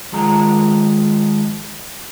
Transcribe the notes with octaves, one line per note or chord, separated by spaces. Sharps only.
D#3 F3 G#3 A#5